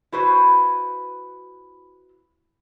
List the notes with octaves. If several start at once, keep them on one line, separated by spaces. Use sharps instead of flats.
E4 F#4 B4 C5